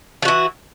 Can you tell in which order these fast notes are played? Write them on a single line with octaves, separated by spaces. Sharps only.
F3 F#4 E3